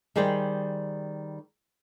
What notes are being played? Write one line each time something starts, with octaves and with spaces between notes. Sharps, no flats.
D#3 G3 G#4 C5 D5 G5